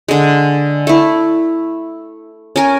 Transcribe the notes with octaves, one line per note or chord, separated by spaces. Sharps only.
D3 G#3
A3 E4
C#4 A#4 G#5